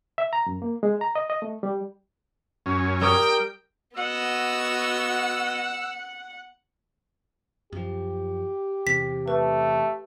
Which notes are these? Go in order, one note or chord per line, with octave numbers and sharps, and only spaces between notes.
E5
A#5
F#2
A#3
G#3
A#5
D#5
D#5
A3
G3
F#2 C#4
G3 A#4 G5 D#6
B3 F#4 D#5 F#5 E6
F#2 F3 G4
E2 C3 B6
A3 B4